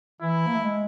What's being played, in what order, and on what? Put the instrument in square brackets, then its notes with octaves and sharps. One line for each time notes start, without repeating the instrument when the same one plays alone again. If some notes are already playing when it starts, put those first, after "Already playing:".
[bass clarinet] E3 [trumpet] E4
[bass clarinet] A#3
A3
G#3